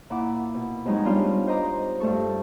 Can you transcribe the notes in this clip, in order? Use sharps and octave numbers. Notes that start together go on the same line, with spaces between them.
A#2 E4 F#5 D6
B2
F2 F#3 G#3 D#4 F#4 C#6
G3 B3 D4 F4
C5 D#5 A#5 D6
G2 A3 A4 C#6